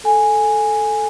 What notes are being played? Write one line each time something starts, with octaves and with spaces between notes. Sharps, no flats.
A4 G#5